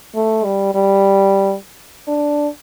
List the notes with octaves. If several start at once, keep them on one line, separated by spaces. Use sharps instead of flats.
A3
G3
G3
D4